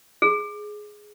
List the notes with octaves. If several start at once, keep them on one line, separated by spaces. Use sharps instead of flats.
G#4